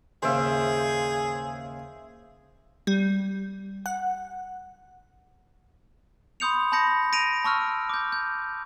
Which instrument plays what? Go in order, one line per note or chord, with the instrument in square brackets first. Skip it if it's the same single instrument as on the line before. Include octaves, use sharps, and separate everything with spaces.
[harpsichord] D#2 G#2 C#3 [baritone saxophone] G#4 [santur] C5 E5 F5
[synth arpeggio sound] G3
F#5
[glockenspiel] B5 C6 D#6 G6 C#7 F7
A5 B5 G6 A#6 C#7
A#6 D7 D#7 F7
A5 C#6 E6 F6
D6 G6
G6